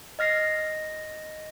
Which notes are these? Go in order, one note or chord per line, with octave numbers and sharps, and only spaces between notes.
D#5 F6 A#6 C7